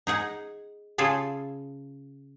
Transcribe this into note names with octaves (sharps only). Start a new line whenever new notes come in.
D#4 G#4 F#5
C#3 F4 G#4 A4